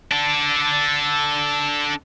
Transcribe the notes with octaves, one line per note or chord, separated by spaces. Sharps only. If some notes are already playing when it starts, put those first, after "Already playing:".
D4 A4